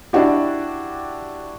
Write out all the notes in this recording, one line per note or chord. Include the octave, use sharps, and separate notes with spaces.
D4 E4 F#4 G4